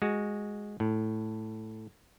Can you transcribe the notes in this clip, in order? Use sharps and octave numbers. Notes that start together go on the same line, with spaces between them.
G#3 F#4
A2